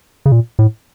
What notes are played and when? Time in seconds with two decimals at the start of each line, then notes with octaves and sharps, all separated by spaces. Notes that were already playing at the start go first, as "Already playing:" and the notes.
0.26 C#3
0.32 A#2
0.59 A2